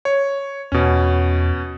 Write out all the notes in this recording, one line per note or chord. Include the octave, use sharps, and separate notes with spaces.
C#5
E2 B2 C#4